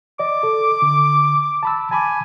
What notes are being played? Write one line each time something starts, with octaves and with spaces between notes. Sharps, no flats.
D5 D#5 D6
A4
D3
A5 B5 E6
G#5 A5 B5 D6